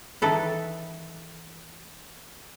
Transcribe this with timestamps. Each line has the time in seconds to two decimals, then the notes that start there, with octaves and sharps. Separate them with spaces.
0.22 D#3 E3 A4 B4